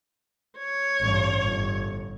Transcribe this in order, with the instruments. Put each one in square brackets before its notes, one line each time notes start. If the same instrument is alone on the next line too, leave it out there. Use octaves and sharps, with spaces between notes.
[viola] C#5
[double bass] A1 G2
G1